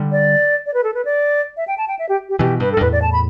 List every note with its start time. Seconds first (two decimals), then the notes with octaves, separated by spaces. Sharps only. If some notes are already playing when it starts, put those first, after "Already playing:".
Already playing: D3 G3
0.12 D5
0.66 D5
0.74 B4
0.84 A4
0.94 B4
1.05 D5
1.57 E5
1.68 G5
1.78 A5
1.88 G5
1.99 E5
2.09 G4
2.29 G4
2.39 B2 E3 G4
2.60 G2 B4
2.72 A4
2.77 G2
2.81 E2 A2 B4
2.92 D5
3.02 A5
3.13 B5